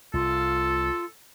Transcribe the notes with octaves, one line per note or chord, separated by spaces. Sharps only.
C2 F4 A4